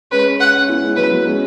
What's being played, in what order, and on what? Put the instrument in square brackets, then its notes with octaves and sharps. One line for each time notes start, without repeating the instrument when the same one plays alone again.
[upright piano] G#3 C#4 [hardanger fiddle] B4
[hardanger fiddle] F#5
[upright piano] C#4
B3 E4
G#3 C#4
[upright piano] F#3 B3 [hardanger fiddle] B4
[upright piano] F#3 B3
G#3 C#4